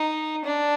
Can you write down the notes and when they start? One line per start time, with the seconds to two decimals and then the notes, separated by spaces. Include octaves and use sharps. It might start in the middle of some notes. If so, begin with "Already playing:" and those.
Already playing: D#4
0.45 D4